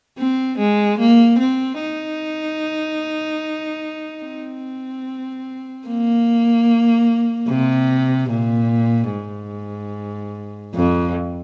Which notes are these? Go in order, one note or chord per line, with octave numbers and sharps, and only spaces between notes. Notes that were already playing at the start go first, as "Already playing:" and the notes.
C4
G#3
A#3
C4
D#4
C4
A#3
C3
A#2
G#2
F2